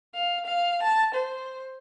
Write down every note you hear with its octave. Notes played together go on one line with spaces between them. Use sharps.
F5
F5
A5
C5